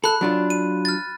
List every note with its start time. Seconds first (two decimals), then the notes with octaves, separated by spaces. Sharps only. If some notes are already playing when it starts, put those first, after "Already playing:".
0.04 A4 B5 F#6
0.21 F#3 D4 F4
0.50 D#7
0.85 F6 A6